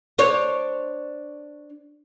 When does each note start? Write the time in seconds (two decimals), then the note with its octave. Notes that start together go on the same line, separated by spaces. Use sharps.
0.18 D4 C5 C#5